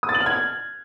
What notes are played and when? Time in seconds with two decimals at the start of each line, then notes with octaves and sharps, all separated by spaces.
0.03 D#6
0.09 A6
0.15 F#7
0.20 F6
0.26 G#6